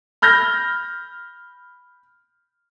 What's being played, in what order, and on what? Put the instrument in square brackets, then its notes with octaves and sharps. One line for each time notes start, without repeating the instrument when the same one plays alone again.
[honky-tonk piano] B5 F6 G6 A#6